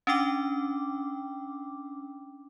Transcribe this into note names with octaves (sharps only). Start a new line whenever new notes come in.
C#4 D4 G5 D6